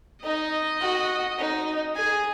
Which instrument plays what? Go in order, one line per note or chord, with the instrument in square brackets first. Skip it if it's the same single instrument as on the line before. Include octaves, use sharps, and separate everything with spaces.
[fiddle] D#4 [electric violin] D#5
[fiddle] F#4
D#4
[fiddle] G#4 [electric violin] G#5